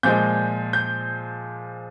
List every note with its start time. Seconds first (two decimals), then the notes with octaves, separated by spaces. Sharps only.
0.03 A#2 F3 G#3 G6
0.73 G6